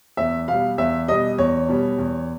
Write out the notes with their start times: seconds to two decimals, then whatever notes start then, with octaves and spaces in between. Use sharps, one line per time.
0.17 E2 E5
0.48 B2 G3 F5
0.78 E2 E5
1.08 B2 G3 D#5
1.38 E2 C#5
1.68 B2 G3
1.98 E2